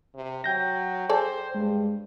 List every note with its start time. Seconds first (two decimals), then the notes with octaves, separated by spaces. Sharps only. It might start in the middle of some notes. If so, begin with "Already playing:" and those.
0.15 C3
0.44 F#3 G5 G6 A#6
1.09 G#4 A4 C5 D5
1.55 G2 G#3